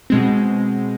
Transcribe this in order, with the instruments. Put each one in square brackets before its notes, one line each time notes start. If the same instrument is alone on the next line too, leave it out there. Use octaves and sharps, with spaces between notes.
[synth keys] B2 G#3 C4